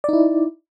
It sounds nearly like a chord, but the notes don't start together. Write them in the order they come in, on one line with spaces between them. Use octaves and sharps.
D5 D#4 E4